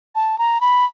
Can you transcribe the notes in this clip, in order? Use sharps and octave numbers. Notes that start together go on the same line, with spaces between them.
A5
A#5
B5